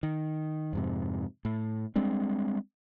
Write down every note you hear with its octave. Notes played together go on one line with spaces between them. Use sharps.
D#3
F2 G#2 C3
A2
G3 G#3 C4 D4